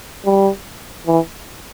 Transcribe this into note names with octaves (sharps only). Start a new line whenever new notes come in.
G3
E3